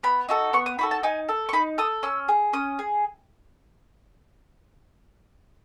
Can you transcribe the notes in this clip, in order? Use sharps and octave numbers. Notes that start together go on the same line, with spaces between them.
B3 B5
D#4 F#4 A4
B3 C#6
D#6
D#4 F#4 A4 B5
A5
D#4 G#5
A4
C#6
D#4 B5
A4 D#6
C#4 E6
G#4
C#4 D#6
G#4